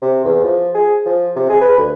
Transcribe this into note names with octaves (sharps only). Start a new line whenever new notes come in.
C3
E2
F3
G#4
F3
C3
G#4
B4
D2